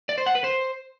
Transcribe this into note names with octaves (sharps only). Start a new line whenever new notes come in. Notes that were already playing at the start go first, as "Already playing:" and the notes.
D5
C5
F#5
B4
C5